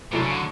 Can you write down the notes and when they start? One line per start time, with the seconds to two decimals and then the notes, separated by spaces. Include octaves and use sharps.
0.12 A2 C3 F#3 A3 D4
0.23 C#3
0.31 D3